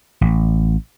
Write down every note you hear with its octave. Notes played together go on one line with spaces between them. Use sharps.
A1